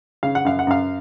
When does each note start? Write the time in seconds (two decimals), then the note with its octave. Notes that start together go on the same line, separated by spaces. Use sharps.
0.23 C#3 F5
0.35 F#5
0.45 F#2 F5
0.59 F#5
0.67 F#2 F5